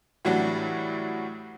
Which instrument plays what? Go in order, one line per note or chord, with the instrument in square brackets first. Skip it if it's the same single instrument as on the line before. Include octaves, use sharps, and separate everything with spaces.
[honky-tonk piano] A2 E3 F#3 G3 D4 F#4